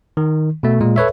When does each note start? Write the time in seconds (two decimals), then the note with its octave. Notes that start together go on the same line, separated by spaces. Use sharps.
0.17 D#3
0.63 B2 A3
0.81 A#2 G#3
0.96 A4 B4 C#5 E5